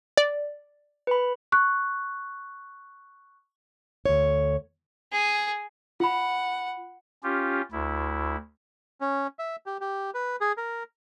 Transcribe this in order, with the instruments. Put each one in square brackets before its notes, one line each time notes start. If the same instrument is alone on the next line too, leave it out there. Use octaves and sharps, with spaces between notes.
[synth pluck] D5
[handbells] B4 B5
[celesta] C#6 F#6
[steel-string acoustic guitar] D2 C#5
[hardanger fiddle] G#4
[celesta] F4 B5 [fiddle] F#5
[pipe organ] C#4 F4 G4
D2 E4
[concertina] C#4
E5
G4
G4
B4
G#4
A#4